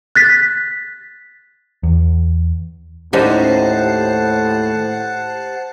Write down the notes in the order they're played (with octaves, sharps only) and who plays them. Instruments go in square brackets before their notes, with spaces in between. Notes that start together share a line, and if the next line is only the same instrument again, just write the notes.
[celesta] F#6 A6 B6
[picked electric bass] E2
[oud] D#2 C#4 D#4 [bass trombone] A2 [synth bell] G4 C5 [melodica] F#5 A5